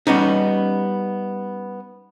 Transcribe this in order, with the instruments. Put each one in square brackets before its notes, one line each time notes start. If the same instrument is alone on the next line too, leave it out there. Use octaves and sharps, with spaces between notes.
[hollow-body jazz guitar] G3 B3 C#4 D#4